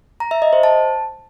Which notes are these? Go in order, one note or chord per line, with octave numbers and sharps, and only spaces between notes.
A#5
E5
D#5
C5
A5